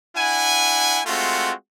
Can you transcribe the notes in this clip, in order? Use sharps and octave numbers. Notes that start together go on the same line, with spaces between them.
D4 E4 F#5 G#5
G#3 A3 C4 F4 F#4 F#5